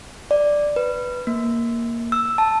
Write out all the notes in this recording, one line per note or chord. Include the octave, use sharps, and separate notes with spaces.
D5
B4
A#3
E6
A5